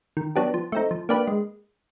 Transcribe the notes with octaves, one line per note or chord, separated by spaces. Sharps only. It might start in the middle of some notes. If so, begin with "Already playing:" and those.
D#3
F#3 B3 D4 G4
F3
A3 C4 D#4
F3
A#3 D4 G4 B4
G#3